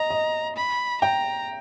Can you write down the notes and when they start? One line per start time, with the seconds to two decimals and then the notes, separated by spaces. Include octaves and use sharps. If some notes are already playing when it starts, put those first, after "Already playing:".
Already playing: D#5 A#5
0.10 D#5
0.56 B5
1.02 G5 A#5